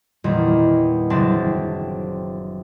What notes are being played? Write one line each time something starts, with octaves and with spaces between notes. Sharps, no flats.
E2 A#2 D#3 G3 A#3
F#1 C4 D4 A5